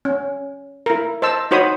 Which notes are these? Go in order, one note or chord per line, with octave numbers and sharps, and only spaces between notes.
C#4
E4 A#4
C5 D#5 A5 E6
D#4 F#4 C5 C#5 B5 D#6